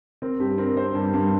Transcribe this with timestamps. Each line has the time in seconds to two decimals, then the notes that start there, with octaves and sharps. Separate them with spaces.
0.22 C4 A#4
0.40 G2 G4
0.58 C4 A#4
0.68 A#4
0.76 C4 C5
0.95 G2
1.13 G2